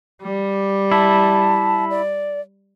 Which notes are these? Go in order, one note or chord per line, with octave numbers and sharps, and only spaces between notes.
G3
E4 A5
D5